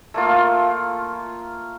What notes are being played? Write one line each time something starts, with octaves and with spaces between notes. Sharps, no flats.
A3 A#3 F4